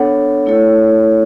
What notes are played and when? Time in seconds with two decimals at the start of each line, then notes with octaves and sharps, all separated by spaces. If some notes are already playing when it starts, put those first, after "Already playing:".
Already playing: B3 D4 A4 C#5 F#5
0.46 A3 E4 A4 C#5